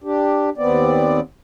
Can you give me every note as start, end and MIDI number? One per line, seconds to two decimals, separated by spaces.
0.04 0.50 62
0.04 0.50 67
0.58 1.20 39
0.58 1.20 59
0.58 1.20 60
0.58 1.20 74